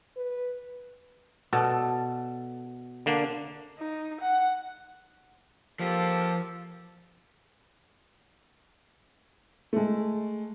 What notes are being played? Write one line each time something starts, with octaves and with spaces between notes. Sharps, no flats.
B4
B2 A4 D5
D3 A#3 D4
D#4
F#5
F3 A#3 G4 A4
G#3 A3